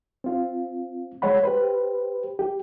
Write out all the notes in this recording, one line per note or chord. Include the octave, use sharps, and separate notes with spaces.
C4 F4
G#3 C#5 F#5 B5
G4 B4 C5
G4